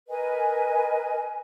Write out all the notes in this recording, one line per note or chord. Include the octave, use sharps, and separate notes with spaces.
A#4 B4 D#5 G#5